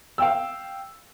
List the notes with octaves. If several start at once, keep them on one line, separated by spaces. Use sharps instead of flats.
F5 G5 E6